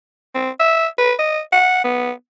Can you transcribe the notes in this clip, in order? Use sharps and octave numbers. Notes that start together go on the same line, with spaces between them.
C4
E5
B4
D#5
F#5
B3